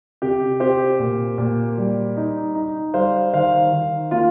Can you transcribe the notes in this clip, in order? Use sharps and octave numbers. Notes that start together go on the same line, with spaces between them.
C3 G4
C4 G4 C5
A#2
A#2
G3
D#4
D#4
G3 C5 F5
D#3 C5 F5
D#3
A#3 F4